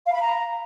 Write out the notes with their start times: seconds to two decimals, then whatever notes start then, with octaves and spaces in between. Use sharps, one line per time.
0.04 F5
0.12 B5
0.21 A#5